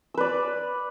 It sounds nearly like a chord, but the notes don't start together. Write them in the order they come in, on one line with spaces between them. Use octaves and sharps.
E6 B4 D5